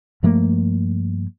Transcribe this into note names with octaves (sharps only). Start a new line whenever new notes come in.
G2 F3 A3 A#3